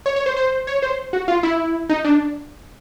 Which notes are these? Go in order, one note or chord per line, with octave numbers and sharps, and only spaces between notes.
C#5
C#5
C5
C5
C#5
C5
F#4
F4
E4
D#4
D4